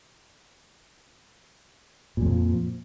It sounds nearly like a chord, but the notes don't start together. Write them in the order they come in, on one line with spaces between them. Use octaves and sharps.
A#2 F2 F3